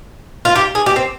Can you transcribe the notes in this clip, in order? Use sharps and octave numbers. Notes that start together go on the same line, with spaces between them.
F4
G4
G#4
G4
C4